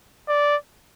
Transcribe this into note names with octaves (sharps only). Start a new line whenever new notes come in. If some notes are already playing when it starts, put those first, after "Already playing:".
D5